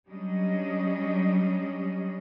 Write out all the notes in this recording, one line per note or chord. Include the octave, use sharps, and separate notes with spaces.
F#3 G3 C#4 D4 D#5